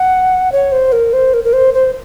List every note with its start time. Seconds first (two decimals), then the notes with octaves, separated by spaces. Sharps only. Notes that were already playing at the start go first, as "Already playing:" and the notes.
Already playing: F#5
0.52 C#5
0.72 C5
0.92 A#4
1.13 C5
1.34 A#4
1.44 A#4
1.53 C5
1.74 C5